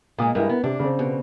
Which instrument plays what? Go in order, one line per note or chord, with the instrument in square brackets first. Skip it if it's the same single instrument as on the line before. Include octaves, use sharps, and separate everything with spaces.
[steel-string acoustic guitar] A#2 G#3 [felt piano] A#3 D#6
[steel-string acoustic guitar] G2 G#3 [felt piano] E4 A#4
[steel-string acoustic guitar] B3
[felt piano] C3 [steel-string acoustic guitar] D4
[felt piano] C#3 C4
[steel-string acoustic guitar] B2